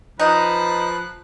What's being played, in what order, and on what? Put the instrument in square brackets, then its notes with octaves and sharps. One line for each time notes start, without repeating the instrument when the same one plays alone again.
[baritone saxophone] F3 [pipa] D#4 [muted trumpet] B4 [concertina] F#6